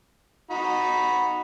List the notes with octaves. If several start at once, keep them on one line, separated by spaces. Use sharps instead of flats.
D#4 F#4 B5